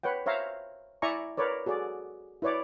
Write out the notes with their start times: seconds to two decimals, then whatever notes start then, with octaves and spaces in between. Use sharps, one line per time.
0.03 B4 C#5 F#5 G5
0.26 C5 C#5 E5 F5 A#5
1.02 E4 D5 E5 G#5 A#5 C#6
1.37 A#4 B4 C#5 D5
1.66 F#4 G#4 A4 D5
2.42 E4 B4 C#5 D5 D6